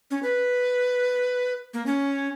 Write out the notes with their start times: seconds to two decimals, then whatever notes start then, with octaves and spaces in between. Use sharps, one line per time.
0.11 C#4
0.23 B4
1.74 A#3
1.86 C#4